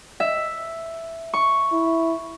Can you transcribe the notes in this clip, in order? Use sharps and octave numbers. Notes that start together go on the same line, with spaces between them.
E5
C#6
E4